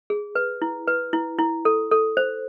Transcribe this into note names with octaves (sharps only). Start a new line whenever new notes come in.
G#4
B4
E4
B4
E4
E4
A4
A4
C5